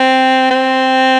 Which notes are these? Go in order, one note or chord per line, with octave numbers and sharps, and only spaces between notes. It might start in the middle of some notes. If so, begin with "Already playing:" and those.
Already playing: C4
C4